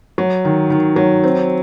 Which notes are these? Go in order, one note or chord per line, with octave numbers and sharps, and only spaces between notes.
F#3
D#3
D#3
F#3
C4